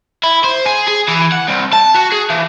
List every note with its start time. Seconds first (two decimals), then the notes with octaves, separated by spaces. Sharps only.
0.24 E4
0.44 C5
0.66 G#4
0.87 G#4
1.08 E3
1.32 F#5
1.48 C2
1.73 A5
1.95 F#4
2.12 G#4
2.30 E3